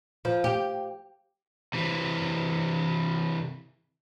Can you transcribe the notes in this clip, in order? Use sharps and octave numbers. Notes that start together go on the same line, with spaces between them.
F3
G4
C3 E3